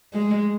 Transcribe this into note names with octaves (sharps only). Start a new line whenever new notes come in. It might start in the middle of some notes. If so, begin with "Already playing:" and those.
G#3